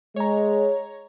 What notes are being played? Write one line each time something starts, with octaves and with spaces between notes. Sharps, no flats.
G#3 C#5 A#5